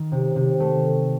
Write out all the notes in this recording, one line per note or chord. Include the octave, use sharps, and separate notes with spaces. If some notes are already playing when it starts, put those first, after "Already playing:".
Already playing: D#3
C3
C3
A3